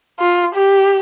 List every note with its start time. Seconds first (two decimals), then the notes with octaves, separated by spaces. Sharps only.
0.20 F4
0.54 G4